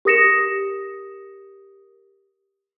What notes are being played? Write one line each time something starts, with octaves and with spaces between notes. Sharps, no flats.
G4 A#4 D#6 A#6 C#7 E7